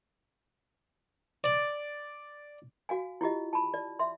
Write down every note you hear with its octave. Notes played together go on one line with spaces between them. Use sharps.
D5
F#4 F5 G#5
E4 F4 G4 D#5
A5 B5
D5
E5 C6